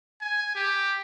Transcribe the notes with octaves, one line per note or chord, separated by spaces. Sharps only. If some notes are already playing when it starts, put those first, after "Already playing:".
G#5
G4